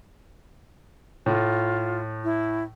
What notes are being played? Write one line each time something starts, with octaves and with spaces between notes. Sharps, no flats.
A2 F4
E4